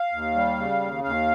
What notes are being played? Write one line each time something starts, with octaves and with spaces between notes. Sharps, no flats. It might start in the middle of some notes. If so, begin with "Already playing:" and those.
Already playing: F5
D#2
G3
C#3
D#2
D#2 F5